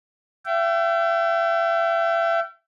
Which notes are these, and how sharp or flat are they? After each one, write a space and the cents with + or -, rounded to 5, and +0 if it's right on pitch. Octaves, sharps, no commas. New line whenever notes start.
E5 +35 G5 -35